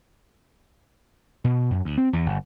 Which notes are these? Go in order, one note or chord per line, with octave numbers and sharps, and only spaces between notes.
B2
F#2
D2
C4
E2
G1